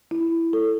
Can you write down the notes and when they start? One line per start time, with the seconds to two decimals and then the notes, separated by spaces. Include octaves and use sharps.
0.11 E4
0.53 A4